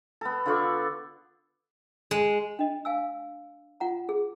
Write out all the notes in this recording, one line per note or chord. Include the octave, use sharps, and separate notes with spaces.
B3 A4
D3 F4 D5 C#6
G#3
D4 D#5
F5 G#5 E6
F4 F#5 A#5
G#4